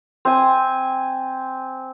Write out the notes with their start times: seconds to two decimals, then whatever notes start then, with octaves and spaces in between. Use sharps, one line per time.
0.25 C4 G#5